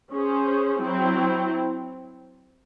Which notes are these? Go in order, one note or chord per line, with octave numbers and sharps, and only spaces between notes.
C#4 G#4 C5
F#3 C4 E4